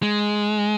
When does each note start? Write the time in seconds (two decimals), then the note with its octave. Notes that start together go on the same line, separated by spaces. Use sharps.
0.02 G#3